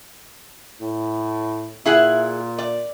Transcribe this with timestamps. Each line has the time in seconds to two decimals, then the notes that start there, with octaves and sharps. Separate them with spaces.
0.81 A2
1.86 A#2 E4 G#4 F#5
2.59 D5